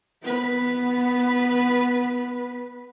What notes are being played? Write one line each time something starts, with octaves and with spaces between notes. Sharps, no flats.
B3 B4